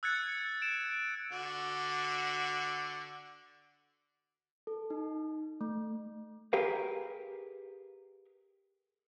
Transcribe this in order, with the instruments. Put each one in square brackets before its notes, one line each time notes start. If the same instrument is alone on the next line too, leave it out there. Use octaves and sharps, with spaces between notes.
[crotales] E6 F#6 G#6 A6 C#7
D7 E7
[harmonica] D3 F#4
[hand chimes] A4
D#4
A3
[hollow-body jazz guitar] G4 G#4 A#4 B4 F5